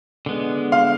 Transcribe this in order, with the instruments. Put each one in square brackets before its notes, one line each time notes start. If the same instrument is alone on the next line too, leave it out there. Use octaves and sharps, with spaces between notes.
[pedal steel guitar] D3 G#3 B3
[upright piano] F5